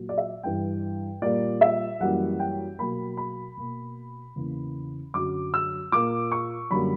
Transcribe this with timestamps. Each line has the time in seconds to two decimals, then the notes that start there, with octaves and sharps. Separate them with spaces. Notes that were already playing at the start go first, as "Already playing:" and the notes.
Already playing: A#2 F#3 A#3
0.09 D5
0.18 E5
0.43 G2 E3 G3 G5
1.22 A#2 G3 A#3 D5
1.61 E5
2.00 F#2 E3 G3 A#3 F#5
2.39 G5
2.79 B2 F#3 A#3 B5
3.17 B5
3.57 B2 A#3
4.36 E2 C#3 E3 A#3
5.14 F#2 D3 F#3 D6
5.54 E6
5.92 A#2 A#3 D6
6.32 C#6
6.71 F#2 D3 G3 A#3 B5